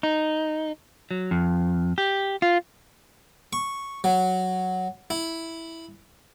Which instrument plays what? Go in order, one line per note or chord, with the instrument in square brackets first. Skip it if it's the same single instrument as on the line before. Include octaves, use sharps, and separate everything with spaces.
[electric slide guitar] D#4
F#3
F2
G4
F4
[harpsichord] C#6
F#3
E4